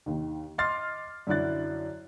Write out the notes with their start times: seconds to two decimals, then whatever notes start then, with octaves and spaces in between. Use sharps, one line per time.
0.06 D#2 D#3
0.58 D#5 C6 D6 F6 A6 C7
1.27 F#2 D3 F#3 E4 F#6 A6